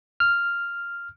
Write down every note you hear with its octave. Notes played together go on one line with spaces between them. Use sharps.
F6